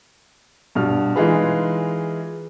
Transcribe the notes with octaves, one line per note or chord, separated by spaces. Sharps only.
G2 B2 F6
E3 G#3 D#4 F4 G#4 B4